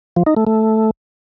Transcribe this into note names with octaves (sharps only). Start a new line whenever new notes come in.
F3
D#4
A3
A3